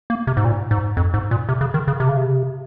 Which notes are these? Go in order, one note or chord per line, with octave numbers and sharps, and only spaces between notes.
A#3
C3
G#2
A#2
G#2
F2
G#2
A#2
C3
C#3
D#3
C#3
C3
C#3
C3